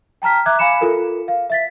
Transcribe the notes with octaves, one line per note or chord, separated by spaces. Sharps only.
G5 A5 A#5 F6 B6
E5 A#5 D6 F#6 G#6
F5 G#5 B5 C#7 E7
F4 A4 A#4
F5
E5 A6 B6